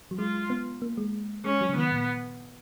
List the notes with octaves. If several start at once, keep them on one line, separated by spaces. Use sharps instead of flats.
F#3
G#3 F4
B3
A#3
G#3
G#3 C#4
F#3
C#3
D#3 B3
A#2